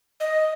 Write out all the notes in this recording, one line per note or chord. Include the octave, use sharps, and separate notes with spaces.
D#5